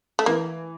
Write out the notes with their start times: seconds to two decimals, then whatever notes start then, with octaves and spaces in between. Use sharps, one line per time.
0.19 A3
0.26 E3 A#3